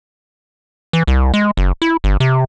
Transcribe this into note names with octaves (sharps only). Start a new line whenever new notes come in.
E3
C2
G#3
F#1
E4
G1
C3